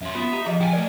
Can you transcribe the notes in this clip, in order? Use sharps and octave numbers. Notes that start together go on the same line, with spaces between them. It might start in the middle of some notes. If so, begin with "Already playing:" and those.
F#2 C#4 E5 C6
B3 F4 E5
G4 D#5 A#5
F3 G#4 D#5
E4 G5 G#5
A3 A#4 D5